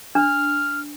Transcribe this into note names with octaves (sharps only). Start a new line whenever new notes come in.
D4 F6